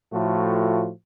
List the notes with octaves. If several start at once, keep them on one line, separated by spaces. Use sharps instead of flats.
A2 F3 A3 F4 F#4